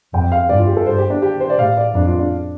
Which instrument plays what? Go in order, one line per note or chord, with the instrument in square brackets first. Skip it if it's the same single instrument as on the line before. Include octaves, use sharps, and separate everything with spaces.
[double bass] F2 [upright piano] G5
[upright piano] F5
[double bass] G2 [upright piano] D5
[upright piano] F4
G4
A4
[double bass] G2 [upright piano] C5
[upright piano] G4
D4
G4
C5
D5
[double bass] A2 [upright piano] F5
[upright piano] D5
[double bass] F2 [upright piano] D4
[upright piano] F4
D4